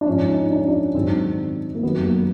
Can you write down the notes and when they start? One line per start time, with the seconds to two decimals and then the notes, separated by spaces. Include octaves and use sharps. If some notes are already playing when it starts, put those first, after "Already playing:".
0.01 D4
0.07 G#2 F3 C#4
0.29 D#4
0.51 D4
0.59 C#4
0.68 D4
0.95 G#2 D#3 F#3 C4
1.75 A#3
1.83 F#2 D#3 F#3 B3
2.05 A#3